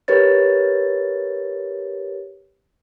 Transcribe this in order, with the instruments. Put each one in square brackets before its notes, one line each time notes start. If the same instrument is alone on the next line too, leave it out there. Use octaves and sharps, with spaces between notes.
[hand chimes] G4 A#4 B4 C#5 A6